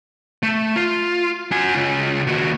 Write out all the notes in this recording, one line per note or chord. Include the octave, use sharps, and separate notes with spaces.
A3
F4
F#4 G#5
C#3 F4
D#2 F#4